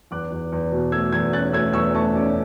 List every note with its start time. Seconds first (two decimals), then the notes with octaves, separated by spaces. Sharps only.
0.11 E2 D6 F#6
0.32 E2
0.52 E2
0.72 B2
0.92 A3 E6 G#6
1.12 E2 E6 G#6
1.33 C#4 F#6 A6
1.53 A3 E6 G#6
1.73 E2 C#6 E6
1.95 A3 A5 C#6
2.15 C#4 D5